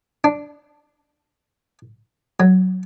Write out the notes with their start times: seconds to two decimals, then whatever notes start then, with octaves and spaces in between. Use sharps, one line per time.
0.24 D4
2.40 F#3